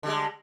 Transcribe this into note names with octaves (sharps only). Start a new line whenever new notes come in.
D3 G3 G#3